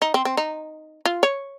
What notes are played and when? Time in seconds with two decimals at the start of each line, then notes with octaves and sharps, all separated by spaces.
0.02 D#4
0.14 C4
0.25 C4
0.37 D#4
1.05 F4
1.23 C#5